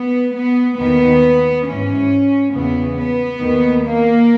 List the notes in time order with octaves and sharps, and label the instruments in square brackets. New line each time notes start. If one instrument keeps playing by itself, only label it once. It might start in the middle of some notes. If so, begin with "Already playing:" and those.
Already playing: [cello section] B3
B3
D#2 D#3 B3
G#2 E3 C#4
E2 C#3 E3 B3
B3
D#2 D#3
A#3